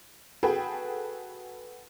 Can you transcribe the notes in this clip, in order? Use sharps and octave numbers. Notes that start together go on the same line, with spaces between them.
F#4 G#4 A4 B4 G5